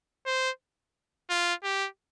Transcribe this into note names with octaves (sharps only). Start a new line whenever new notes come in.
C5
F4
G4